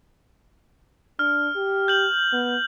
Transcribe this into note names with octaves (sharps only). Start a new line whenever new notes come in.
D4 F6
G4
G6 F#7
B3